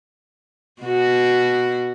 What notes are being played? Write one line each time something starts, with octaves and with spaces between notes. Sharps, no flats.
B2 F#4